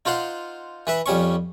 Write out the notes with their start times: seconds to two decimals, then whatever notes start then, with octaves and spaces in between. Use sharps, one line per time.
0.05 D#4 F4 C5 F#5 C6
0.87 E3 B4 E5
1.06 F2 G3 C#4 C#6